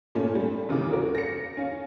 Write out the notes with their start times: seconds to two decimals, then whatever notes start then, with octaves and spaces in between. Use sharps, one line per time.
0.15 A#2 A3 C#4
0.35 G3
0.69 D#2 C#3 E3 D6
0.93 F#4 A#4
1.15 A#6 C#7
1.57 C#4 F5